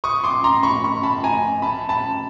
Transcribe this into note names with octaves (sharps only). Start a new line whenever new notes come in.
C#6 D#6
C6 D6
A#5 C6
B5 C#6
B5 C#6
A5 B5
G#5 A#5
A5 B5
A5 B5